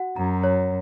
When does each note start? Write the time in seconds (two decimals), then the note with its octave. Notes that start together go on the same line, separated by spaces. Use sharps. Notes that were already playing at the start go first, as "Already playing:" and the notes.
Already playing: F#4 F#5
0.16 F#2 A#5
0.44 C#5